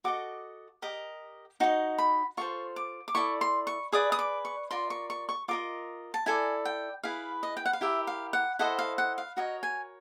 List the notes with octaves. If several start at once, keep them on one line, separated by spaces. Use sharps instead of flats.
F#4 A4 D#5 D6
G4 A#4 D#5
D#4 F#4 D#5
B5
F4 A4 C5 C#6
D6
D6
E4 A4 D5 C#6
C6
C#6
G#4 B4 D5 D#6
D#6
D6
C#6
F4 A#4 D5 C6
C#6
C#6
C#6
F4 A#4 D#5 D6
A5
E4 A4 D5 G#5
G5
E4 G#4 B4 F5
D#5
G5
F#5
F5
E4 G4 A#4 E5
F5
F#5
E4 A4 C5 D#5 F#5
F5
F#5
F5
F#4 A#4 C#5 D#5
G#5